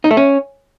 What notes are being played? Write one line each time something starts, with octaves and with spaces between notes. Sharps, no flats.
D#4
A3
C#4